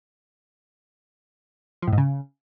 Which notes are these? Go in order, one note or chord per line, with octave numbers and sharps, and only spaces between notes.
F3
A2
G#2
C#3